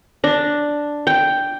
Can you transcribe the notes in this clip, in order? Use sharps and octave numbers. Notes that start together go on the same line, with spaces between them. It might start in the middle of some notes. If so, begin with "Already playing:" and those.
D4
G5